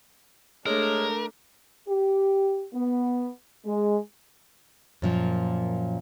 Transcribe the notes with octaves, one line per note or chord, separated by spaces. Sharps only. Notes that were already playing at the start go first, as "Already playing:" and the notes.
G#3 A3 D4 A#4 C#5
G4
B3
G#3
F#2 A#2 F3